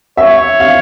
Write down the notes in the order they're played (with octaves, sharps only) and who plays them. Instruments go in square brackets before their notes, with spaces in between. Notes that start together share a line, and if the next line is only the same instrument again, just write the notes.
[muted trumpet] C#5 [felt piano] E5
[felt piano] F5